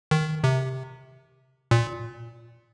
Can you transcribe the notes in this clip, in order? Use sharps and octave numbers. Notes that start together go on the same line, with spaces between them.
D#3
C3
A#2